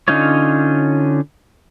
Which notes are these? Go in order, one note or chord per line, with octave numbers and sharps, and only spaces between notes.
D3 C#4 D#4 F4 C#5